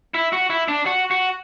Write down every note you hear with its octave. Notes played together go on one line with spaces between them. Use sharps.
E4
F#4
E4
D4
F#4
F#4